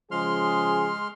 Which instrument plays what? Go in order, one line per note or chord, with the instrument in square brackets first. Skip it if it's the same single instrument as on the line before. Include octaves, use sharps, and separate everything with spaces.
[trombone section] C#3 F3 G#4 [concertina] G#3 C6 F6